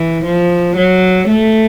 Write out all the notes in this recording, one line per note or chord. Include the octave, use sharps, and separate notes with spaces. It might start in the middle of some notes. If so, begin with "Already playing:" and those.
Already playing: E3
F3
F#3
A3